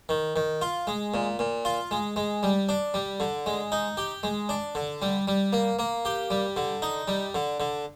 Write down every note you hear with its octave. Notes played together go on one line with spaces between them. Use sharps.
D#3
D#3
F4
G#3
A#2
A#2
F4
G#3
G#3
G3
D4
G3
D3
G#3
D#4
G4
G#3
D4
D3
G3
G3
A#3
A#3
G4
G3
D3
D#4
G3
D3
D3